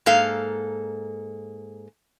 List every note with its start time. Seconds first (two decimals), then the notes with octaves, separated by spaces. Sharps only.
0.06 G#2 A#3 A4 F5